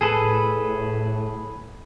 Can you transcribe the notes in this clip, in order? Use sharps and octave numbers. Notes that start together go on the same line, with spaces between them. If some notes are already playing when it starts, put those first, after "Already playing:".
A2 G#4 A4 B4